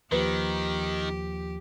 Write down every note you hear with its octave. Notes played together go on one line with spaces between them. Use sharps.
D#2 D#3 F3 G4 B4